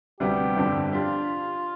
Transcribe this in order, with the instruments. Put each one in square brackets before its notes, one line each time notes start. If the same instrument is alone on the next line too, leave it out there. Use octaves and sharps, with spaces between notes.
[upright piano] D2 C3 G3 B3 [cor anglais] G4
[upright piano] G1 F2 D3 G3
[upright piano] D4 G4 [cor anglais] F4